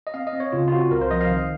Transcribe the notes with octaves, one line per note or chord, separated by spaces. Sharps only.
D#5
C4 F5
D#5
C4
C#5
C#3 F4
F4
C4 F#4
C2 A#4
C5
F3 D#5
F5
D#3